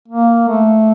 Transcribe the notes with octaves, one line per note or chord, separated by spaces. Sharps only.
A#3
A3